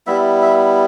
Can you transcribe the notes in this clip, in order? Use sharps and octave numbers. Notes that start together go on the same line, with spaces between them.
G3 B3 E4 E5
E5